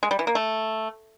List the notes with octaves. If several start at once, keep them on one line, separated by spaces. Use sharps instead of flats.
G#3
G3
E3
A#3
A3